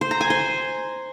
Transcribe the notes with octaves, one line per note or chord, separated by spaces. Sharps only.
C5
A#5
G#5
C5